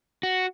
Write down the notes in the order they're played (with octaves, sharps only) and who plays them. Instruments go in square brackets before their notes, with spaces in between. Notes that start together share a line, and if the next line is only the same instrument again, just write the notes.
[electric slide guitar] F#4